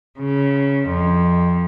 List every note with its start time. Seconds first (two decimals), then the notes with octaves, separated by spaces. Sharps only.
0.19 C#3
0.88 F2